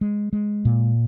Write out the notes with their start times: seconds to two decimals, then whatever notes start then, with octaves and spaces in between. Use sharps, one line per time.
0.01 G#3
0.33 G#3
0.65 A#2